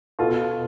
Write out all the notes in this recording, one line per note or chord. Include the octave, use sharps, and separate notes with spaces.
B2 F4 A4